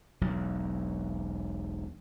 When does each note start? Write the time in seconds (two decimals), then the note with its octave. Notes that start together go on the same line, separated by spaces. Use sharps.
0.21 E1 B1 F#3